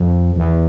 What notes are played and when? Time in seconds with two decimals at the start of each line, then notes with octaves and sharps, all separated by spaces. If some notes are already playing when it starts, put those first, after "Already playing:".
Already playing: F2
0.36 E2